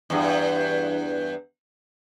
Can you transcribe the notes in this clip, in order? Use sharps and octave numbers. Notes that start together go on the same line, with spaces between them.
E2 G2